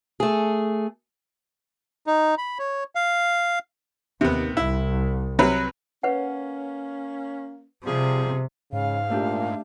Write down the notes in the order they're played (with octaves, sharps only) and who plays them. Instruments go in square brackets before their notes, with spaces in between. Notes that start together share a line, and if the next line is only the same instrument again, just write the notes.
[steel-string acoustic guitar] A3 G#4
[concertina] D#4
B5
C#5
F5
[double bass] D#2 [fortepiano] C3 B3
[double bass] C2 [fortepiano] E4
[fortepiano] C3 F#3 B4
[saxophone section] A#3 C#4 [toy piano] B4 C#5 F#5
[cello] C3 [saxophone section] F3 G3 G#4
[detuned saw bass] G#2 [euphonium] C#3 [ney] F5
[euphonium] A#2 [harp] A3 D4 G4